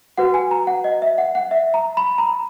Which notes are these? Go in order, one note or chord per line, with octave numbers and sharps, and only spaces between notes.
F#4 B4 F#5
G#5
A#5
F#5
D#5
E5
F#5
F#5
E5
A#5
B5
A#5